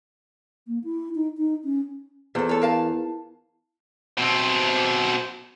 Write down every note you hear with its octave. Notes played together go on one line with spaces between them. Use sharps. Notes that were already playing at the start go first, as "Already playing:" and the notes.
A#3
E4
D#4
D#4
C#4
E2 A4 C5
A4 C#5
A#4 F5 A5
B2 C4